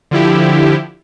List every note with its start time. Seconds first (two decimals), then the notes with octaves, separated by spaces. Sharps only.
0.11 D3 F3 E4 G4